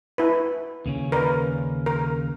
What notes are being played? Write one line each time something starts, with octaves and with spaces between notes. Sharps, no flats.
E4 B4
D#2 C#3 C#4
A#4 B4 D5
A#4